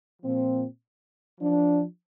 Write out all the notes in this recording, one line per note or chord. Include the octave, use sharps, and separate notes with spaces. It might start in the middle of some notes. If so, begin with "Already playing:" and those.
A#2 F3 C4
F3 D4